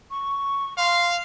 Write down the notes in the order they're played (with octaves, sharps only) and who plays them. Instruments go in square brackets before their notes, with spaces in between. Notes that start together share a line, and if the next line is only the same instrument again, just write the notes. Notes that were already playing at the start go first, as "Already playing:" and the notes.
[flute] C#6
[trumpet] F5 [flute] C6